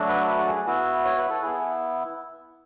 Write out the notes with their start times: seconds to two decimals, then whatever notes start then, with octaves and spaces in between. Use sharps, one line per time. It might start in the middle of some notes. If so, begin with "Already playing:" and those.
Already playing: F#3 A3 D4 F#4
0.09 B4
0.28 B4
0.38 A4
0.47 G#4
0.66 B3 E4 F#4
1.05 C#5
1.18 B4
1.30 A4
1.43 B3 E4 G#4